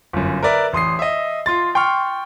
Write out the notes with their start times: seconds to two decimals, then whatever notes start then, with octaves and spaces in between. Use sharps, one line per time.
0.13 G1 F#2
0.43 A#4 B4 D5 E5
0.73 A1 C6 D#6 C7
0.99 D#5 E5
1.46 F4 C6 A6
1.75 G5 C6 C#6 F6